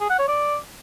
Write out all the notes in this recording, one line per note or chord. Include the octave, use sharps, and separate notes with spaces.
G#4
F#5
C#5
D5